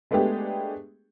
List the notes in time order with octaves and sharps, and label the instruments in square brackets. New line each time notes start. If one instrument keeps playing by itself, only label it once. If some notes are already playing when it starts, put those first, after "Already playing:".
[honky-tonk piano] G#3 A3 B3 D4 G4 G#4